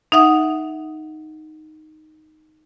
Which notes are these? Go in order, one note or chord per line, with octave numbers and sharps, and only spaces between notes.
D#4 E5 F#5 D#6